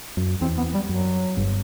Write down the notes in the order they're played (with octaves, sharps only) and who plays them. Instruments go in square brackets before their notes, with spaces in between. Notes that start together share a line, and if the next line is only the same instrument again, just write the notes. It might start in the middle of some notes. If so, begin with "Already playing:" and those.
[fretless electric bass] F#2
[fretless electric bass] E2 [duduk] C4
[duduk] B3
G3
[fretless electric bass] F#2 [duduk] F#3
[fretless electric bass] G1 G2